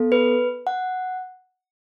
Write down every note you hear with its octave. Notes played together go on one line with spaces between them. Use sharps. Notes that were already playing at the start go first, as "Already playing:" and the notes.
Already playing: B3 A4
B4
F#5